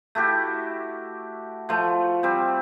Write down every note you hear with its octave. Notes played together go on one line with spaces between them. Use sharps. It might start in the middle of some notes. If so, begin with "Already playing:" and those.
A3 E4 F#4 G4
F3 A3
G3 C4